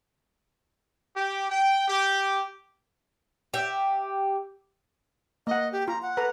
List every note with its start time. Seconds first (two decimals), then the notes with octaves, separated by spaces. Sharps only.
1.15 G4
1.50 G5
1.88 G4
3.54 G4 E5
5.47 A#3 D#5 F#5
5.72 G4
5.88 F4 A#5
6.02 F#5
6.17 A4 B4 A#5